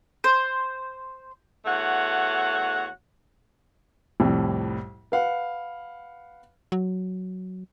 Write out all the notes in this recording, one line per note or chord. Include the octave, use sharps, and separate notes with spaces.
C5
E2 A3 F#4 C#5 F#5
C2 F2 A2
B4 F5 F#5
F#3